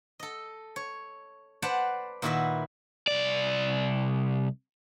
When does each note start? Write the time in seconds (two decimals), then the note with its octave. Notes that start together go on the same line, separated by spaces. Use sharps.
0.19 A4 D#5
0.76 C#5
1.62 B4 C5 D5 F#5 A5
2.22 A#2 D#3 E4 F#4 B4 E5
3.08 C2 D5